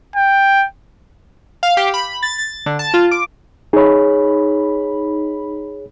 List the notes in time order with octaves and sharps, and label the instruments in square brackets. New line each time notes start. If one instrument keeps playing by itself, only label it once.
[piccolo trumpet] G5
[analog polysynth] F5
G4
B5
A6
A6
D3
A5
F4
D6
[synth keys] D#4 B5 [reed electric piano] G#4 C#5